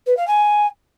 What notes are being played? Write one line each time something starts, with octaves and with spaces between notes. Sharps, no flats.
B4
F5
G#5